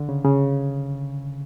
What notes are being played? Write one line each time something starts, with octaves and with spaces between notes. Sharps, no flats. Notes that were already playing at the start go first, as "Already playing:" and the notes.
Already playing: D3
C#3
C#3